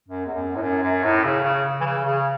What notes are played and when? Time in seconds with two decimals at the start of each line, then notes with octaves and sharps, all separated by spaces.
0.08 F#2
0.26 E2
0.34 F#2
0.56 A2
0.62 F#2
0.83 F#2
1.04 A2
1.24 C#3
1.44 C#3
1.81 E3
1.86 C#3
2.05 C#3